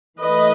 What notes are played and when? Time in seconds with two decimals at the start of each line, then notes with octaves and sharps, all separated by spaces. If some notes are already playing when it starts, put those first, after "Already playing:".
0.21 E3 A3 B4 D#5